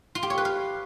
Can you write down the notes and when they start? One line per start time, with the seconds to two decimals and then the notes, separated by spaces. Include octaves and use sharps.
0.15 F4
0.23 G4
0.30 C#5
0.38 B4
0.45 F5